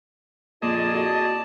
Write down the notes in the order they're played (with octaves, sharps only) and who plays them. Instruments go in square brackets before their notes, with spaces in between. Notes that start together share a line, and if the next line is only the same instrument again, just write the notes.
[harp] F2 A#2 A#3 [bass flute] F4 [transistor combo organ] G#4 D#5 [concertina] D5 A5
[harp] E4 A4 [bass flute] F#4